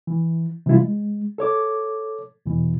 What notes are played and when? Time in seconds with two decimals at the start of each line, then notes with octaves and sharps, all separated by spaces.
0.07 E3
0.66 C3 E3 G3 E4 F4
0.80 G#3
1.38 A4 C#5 D6
2.46 E2 B2 E3